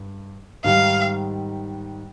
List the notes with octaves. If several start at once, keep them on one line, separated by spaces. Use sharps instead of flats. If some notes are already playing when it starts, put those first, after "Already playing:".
Already playing: G2
G#2 D#3 G3 F5